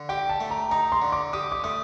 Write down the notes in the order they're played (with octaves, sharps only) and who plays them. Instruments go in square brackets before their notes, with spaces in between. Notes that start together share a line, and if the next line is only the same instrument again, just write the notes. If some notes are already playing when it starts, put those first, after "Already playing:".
Already playing: [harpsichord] D3
[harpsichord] G4 [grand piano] G5
[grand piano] A5
[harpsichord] A3
[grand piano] A#5
[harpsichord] D#4 [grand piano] A#5
[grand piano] C6
[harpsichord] D3
[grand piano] D6
[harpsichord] G4 [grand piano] D#6
[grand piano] D6
[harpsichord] A3 [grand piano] D#6